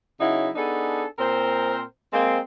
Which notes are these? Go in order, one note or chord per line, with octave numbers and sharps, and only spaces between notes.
C#3 F#3 D#4 E4
B3 D4 D#4 G#4 A4
A#2 C4 A#4 C5
G#3 A#3 C4